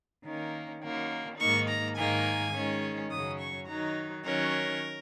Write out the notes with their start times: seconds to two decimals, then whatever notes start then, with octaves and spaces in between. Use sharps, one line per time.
0.25 D#3 A#3 C#4
0.82 F#2 D#3 A#3
1.39 G#2 D#3 A#3 D#4 C#6
1.68 A#5
1.97 G#2 D#3 A#3 G#5
2.54 D#3 G#3 C#4
3.11 F#2 C#3 F#3 C#4 D#6
3.40 C#6
3.68 D#3 F#3 D#4 A#5
4.25 D#3 F#3 C#4 A#4